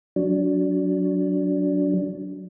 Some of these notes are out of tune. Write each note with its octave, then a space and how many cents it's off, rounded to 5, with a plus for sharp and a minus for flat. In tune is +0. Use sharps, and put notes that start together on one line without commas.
F#3 +0 D4 -20